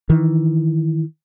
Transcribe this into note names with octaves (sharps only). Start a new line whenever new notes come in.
D#3 E3